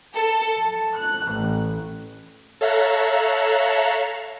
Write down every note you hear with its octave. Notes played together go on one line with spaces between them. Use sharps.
A4
A5
F#6
A1
A4 C#5 E5 F5 A#5 F#6